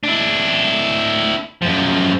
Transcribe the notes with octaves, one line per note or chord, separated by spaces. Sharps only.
D4 E4
F#2 F3